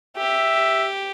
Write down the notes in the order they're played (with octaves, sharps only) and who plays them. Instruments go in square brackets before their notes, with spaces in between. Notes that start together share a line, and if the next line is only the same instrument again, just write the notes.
[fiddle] G4 [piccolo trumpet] E5